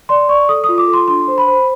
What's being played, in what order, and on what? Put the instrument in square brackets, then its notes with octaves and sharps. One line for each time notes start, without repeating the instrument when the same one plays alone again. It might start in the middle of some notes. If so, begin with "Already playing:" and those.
[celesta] D5 C6
D5 C#6
A4 D#6
F4 D#6
D6
A4
C6
D4 C6
C5
B5
C5